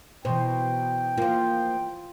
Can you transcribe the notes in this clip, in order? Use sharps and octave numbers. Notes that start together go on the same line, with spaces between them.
B2 E3 C5 G5
F3 A#3 F4